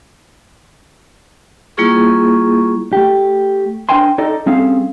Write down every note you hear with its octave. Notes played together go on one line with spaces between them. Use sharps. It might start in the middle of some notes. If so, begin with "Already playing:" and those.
G3 A#3 E4 F4 G#4 C#6
A3 G4
D4 A#4 C5 G5 G#5 C6
D#4 A4 D5 D#5
G3 C4 C#4 G#4 A4 F5